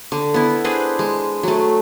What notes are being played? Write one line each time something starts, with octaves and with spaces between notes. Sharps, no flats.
D3
B3 E4
D4 G#4 B4 C5
G#3
F#3 A3